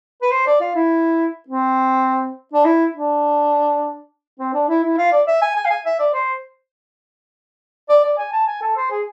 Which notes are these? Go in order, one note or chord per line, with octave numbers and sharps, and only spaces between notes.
B4
C5
D5
F4
E4
C4
D4
E4
D4
C4
D4
E4
E4
F4
D5
E5
G#5
G#5
F5
G#5
E5
D5
C5
D5
D5
G#5
A5
G#5
A4
C5
G#4